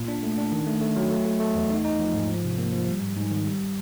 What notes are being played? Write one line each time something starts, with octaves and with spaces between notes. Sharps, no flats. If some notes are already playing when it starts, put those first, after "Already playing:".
Already playing: A#2
D4
A3
D4
D#3
A3
A3
F#3
A3
A3
A3
E2
D#4
D#4
F3
G#2
F3
C3
A#3
F3
G3
G#2
G#2
D#3
G3